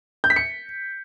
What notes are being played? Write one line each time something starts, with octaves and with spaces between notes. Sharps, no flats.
G6
B6
C#7